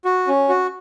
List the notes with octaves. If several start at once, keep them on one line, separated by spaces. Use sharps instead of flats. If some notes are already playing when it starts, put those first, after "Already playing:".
F#4
C#4
F#4